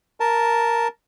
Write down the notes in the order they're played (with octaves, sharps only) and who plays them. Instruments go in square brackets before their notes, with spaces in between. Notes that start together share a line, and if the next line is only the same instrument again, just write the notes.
[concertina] A#4 A5